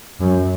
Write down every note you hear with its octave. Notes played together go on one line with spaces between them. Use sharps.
F#2